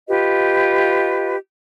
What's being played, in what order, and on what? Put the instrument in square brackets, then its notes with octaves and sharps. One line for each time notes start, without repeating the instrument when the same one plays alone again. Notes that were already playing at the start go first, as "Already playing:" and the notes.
[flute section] F4 G4 B4 D#5